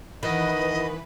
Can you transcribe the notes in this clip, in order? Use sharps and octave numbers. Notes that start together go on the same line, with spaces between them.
D#3 E3 D#4 B4 D#5 F#5 B5